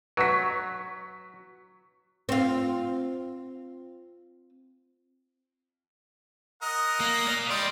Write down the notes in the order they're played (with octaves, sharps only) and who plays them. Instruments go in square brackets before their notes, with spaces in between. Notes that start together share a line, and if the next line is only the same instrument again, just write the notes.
[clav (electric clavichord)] F#3 [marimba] B4 F#5 [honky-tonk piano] C#6 B6
[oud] C4 F4
[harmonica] A#4 D#5 F#5
[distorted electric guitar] A#3
D5 F5
[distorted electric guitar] G#2 D5 [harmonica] G3 D#4 C6